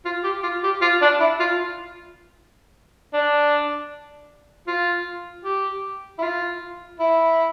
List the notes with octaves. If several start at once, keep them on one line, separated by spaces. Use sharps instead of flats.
F4
G4
F4
G4
F4
D4
E4
F4
D4
F4
G4
E4
F4
E4